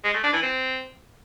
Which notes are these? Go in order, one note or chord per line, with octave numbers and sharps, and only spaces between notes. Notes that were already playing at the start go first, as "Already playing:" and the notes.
G#3
A3
D4
E3
C4